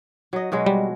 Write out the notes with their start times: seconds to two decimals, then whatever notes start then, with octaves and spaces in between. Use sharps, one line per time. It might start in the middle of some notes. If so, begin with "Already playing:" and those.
0.33 F#3 D#5
0.52 B2 F#3 G#3
0.66 G3